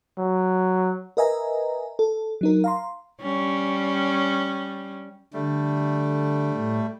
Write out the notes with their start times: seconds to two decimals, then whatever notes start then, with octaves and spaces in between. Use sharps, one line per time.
0.18 F#3
1.17 A#4 B4 D#5 E5 G#5 A#5
1.99 A4
2.41 F#3 D#4 A#4
2.64 F5 A#5 C6
3.22 G3 C#4
5.34 D3 G3 A3
6.54 A2